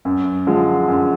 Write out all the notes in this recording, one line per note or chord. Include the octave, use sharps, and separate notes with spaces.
F#2
D3 F3 G#3
F#2